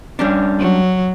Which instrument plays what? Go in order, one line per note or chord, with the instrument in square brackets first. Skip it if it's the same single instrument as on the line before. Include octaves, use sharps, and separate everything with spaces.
[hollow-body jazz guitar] G3 C#4 D4
[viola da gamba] F#3